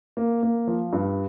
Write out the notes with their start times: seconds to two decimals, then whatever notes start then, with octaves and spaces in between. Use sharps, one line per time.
0.17 A#3
0.43 A#3
0.67 F3
0.93 G2